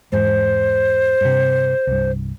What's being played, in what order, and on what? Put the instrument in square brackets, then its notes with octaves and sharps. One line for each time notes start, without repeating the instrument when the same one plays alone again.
[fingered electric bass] E2 G#2 [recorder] C5
[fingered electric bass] G2 C3
C2 G2